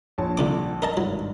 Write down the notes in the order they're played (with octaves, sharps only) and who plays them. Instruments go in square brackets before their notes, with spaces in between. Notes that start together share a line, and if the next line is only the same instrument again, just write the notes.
[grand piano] A#1 C#5 A5
[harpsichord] C2 D3 D6
A#4 D#5 A5
[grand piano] G#1 G2 [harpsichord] F#3